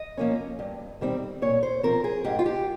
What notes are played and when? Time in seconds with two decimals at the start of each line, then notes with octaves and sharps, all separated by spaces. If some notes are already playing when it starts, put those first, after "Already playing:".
Already playing: D#5
0.17 F3 A#3 C#4
0.59 G2
1.01 D#3 G3 C4
1.42 A#2 C#5
1.63 C5
1.83 F3 C4 A#4
2.04 G#4
2.24 G#2 G4
2.39 F4
2.46 G4